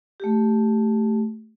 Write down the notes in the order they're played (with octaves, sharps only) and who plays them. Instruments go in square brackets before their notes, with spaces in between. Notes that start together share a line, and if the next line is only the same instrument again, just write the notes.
[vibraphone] A3 G4